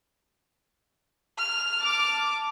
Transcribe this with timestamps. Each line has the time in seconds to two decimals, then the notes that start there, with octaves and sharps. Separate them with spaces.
1.38 F6
1.80 A5 D6